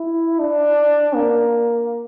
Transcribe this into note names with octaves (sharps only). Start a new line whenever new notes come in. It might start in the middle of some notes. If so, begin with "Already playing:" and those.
Already playing: E4
D4
A#3